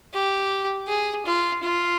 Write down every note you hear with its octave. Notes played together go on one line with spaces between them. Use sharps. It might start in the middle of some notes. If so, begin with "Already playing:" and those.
G4
G#4
F4
F4